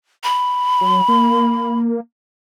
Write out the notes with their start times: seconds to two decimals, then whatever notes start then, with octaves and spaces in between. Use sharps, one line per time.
0.24 B5
0.81 F#3
1.08 A#3